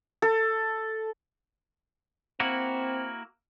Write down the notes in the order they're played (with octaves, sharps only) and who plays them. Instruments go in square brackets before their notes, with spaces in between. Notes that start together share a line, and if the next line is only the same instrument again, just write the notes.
[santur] A4
[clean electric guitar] A#3 E4 F#4 [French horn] C4